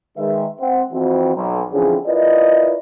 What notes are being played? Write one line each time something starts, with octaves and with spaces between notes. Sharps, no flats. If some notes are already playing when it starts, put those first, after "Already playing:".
D#3 G#3 B4 E5
C4 F#5
F2 E3 C4 F#4
B1
D3 E3 F3 C4 C#4 G#4
E4 F4 A#4 B4 D5 D#5